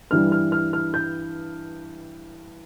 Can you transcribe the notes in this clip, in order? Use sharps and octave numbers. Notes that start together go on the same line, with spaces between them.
G2 E3 G3 F6
F6
F6
F6
G6